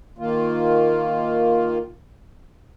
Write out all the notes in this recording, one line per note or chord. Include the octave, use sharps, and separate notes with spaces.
D#3 A#3 F4